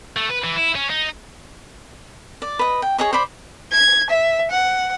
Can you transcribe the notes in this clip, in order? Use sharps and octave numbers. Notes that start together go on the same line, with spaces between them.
A3
B4
E3
E4
C#4
D#4
D5
B4 D#5
G5
G#4 C#5 D#5 C#6
C5 D5 B5
G#6
E5
F#5